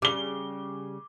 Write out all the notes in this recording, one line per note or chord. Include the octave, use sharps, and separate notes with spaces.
C#3 G3 D6 G7